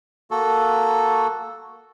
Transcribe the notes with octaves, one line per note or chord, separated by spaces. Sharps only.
A#3 F#4 A4